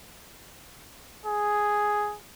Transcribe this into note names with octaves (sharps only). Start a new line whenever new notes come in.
G#4